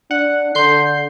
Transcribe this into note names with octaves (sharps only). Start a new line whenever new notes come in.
D4 F#5
D3 C6 G6 C7